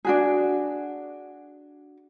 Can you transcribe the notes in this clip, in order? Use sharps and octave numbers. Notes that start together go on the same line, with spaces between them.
D4 F#4 G#4